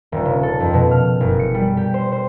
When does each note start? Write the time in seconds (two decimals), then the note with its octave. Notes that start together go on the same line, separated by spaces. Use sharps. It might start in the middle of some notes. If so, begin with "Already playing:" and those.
0.12 D#1
0.25 C#3
0.43 A4
0.60 F2
0.74 B2
0.91 F6
1.21 F#1
1.39 C#7
1.55 G3
1.77 G4
1.94 C5
2.12 C5